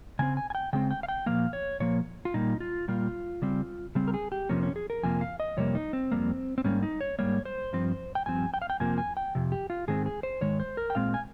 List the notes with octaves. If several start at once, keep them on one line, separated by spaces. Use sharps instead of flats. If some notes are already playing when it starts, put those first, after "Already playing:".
C#3 G#3 C4 G#5
G#5
G#5
G5
C#3 G#3 C4 G5
G5
F5
G5
A#2 F3 A#3 F5
C#5
A#2 F3 A#3 C#5
F4
A#2 G3 A#3 D#4
F4
A#2 G3 A#3 F4
C#3 G3 C4
C#3 G3 C4
A#4
G#4
G4
F2 C3 F3 A#3 C#4
C#4
G#4
A#4
F2 C3 F3 A#3 G#5
F5
D#5
F2 C3 G3 A#3 C#5
D#4
C4
F2 C3 G3 A#3
C4
G#2 G3 A#3 C#4
D#4
C#5
G#2 G3 A#3 C#5
C5
G2 F3 C4
G5
G2 F3 C4 G#5
G5
F5
G5
F2 C3 F3 A#3 G#5
G#5
G5
F2 C3
G4
F4
G#2 D#3 G#3 C4 G#4
G#4
C5
G#2 D#3 G#3 C#5
C5
A#4
G5
A#2 G#3 C4 F5
G#5